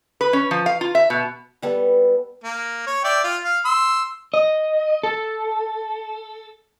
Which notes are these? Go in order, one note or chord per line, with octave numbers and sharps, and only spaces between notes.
B4
C#4
F3
F5
F4
E5
B2
G3 B3 A4
A#3
C#5
D5 E5 G5
F4
F5
C6 E6
D#5
A4